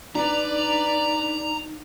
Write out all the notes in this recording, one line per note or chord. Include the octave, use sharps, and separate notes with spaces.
D4 D#4 B4 D5 A#5